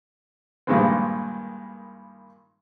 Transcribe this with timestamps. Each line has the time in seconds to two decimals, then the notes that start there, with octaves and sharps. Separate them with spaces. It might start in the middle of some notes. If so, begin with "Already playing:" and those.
0.67 G2 A#2 D#3 G#3 B3 C4